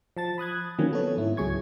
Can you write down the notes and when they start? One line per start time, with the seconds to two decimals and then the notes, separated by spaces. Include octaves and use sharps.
0.17 F3 A5 A6
0.38 B5 D#6 F#6 G#6
0.78 D#3 F3 F#3 A#3 C4 C#4
0.91 B3 A4 C#5
1.18 G#2 E4
1.37 C#2 F#3 G#4 C#6 G#6